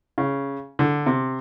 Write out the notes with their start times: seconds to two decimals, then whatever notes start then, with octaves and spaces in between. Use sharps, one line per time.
0.18 C#3
0.79 D3
1.06 C3